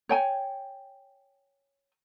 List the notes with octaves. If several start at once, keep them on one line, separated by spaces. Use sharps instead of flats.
C#5 G5 G#5